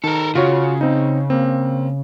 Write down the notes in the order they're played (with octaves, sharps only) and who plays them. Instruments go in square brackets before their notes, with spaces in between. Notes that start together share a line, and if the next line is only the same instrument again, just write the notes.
[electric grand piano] D#3 [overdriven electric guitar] A4 A#4
[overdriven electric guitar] C#3 [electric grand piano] F4 F#4 C#5
[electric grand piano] C4 D#4
A#3 C4